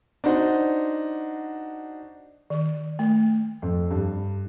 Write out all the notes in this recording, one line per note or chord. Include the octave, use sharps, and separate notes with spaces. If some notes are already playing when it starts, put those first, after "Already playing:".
D4 D#4 F#4 C5
D#3
A3
F2
G2